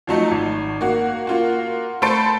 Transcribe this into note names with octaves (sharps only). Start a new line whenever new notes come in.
F3 F#3 A3 D#4
G#1
A#3 F#4
A#3 F4 F#4
A3 A4 C5 B5 A6 D7